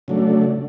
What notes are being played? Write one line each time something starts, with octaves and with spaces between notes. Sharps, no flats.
C#3 F#3 A3 D4